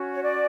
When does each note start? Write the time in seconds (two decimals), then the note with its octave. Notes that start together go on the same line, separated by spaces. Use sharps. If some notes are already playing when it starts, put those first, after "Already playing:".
Already playing: C#4 F#4
0.13 C#5
0.23 D5